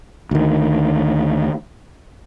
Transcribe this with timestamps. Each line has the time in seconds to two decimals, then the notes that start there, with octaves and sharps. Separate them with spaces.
0.31 D2 D#3